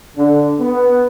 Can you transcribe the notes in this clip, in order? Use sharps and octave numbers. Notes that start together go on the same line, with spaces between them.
D3
B3